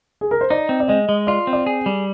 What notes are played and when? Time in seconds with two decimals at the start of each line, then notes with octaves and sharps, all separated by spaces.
0.21 G#4
0.31 A#4
0.41 C5
0.50 D#4 D5
0.69 C4
0.80 D5
0.88 G#3 D#5
1.09 G#3
1.27 F4 D5
1.47 C4
1.53 D5
1.66 G#4
1.86 G3